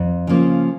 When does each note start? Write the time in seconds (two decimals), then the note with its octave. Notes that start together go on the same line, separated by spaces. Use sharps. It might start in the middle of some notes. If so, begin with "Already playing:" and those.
Already playing: F2
0.27 C#3 F3 A#3